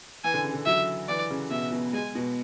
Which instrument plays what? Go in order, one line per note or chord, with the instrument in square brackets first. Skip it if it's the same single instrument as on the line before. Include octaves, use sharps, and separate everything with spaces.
[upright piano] E3 [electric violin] G#5
[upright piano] D3
C#3
D3
[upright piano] F#3 [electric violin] E5
[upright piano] E3 [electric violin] D5
[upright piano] C#3
[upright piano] B2 [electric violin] E5
[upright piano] B2
[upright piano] G#3 [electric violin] G#5
[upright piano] B2